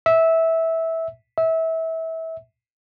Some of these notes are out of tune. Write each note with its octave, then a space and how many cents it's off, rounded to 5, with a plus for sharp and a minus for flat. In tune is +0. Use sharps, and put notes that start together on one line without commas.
E5 -15
E5 -25